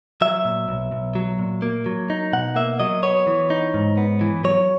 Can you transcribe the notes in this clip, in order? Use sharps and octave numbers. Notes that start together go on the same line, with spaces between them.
F#3 E5
A#2
B1
B1
F#3
A#2
A#3
F#3
D#4
B2 F#5
A#3 E5
F#3 D#5
B3 C#5
E3
D#4
G#2
B3
E3
F#3 C#5